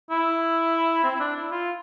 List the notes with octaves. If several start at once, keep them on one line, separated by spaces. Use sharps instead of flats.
E4
C4
E4
D4
E4
F4